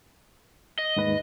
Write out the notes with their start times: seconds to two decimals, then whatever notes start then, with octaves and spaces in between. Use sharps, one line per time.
0.79 D#5
0.96 D#2 G#2 B4